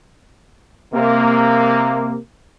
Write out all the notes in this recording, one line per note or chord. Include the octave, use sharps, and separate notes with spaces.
C3 A#3